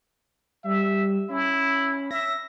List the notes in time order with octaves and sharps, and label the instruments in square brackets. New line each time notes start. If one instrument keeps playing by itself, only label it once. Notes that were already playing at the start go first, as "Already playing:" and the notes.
[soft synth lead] G3 [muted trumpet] E5
[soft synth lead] C#4 [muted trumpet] E4
[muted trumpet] E5 [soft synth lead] A#6